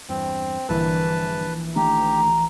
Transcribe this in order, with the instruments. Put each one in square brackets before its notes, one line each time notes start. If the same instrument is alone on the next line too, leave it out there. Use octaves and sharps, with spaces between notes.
[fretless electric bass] E2 G2 [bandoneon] C4
[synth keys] A#1 E3 [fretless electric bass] G2 D3 [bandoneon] B4 A5
[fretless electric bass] D#3 A3 D4 [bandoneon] G4 [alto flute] A#5